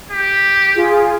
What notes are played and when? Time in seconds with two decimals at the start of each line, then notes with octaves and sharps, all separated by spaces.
0.11 G4
0.75 F4 G#4